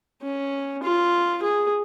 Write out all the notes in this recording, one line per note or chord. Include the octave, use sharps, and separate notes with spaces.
C#4
F4
G#4